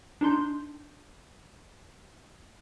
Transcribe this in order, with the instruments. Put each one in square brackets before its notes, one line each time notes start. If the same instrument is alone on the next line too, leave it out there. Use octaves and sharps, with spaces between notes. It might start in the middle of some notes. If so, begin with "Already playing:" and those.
[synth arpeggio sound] D4 D#4 C6 G6